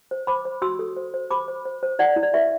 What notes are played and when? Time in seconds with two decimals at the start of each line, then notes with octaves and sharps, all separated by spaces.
0.11 C5
0.27 C5 B5 D6
0.45 C5
0.62 F#4 C6 E6
0.79 A4
0.96 C5
1.14 C5
1.31 C5 B5 D6
1.48 C5
1.65 C5
1.83 C5
1.99 E4 D5 F#5
2.16 E4
2.23 D5
2.34 B4 E5